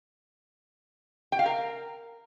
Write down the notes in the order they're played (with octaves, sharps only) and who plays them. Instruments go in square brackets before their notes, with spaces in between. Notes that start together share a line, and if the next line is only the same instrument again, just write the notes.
[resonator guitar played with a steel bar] G5
F5
A#4